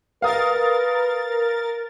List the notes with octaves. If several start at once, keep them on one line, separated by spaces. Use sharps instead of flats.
A#4 B4 F5 D#6 A6